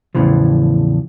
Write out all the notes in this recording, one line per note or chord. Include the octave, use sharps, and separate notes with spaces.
E2 A2 C#3 E3 F3